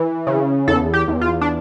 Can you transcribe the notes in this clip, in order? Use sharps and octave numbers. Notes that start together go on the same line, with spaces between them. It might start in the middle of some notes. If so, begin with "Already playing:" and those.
Already playing: E3
C#3
E2 A4
G4
E2
F4
D4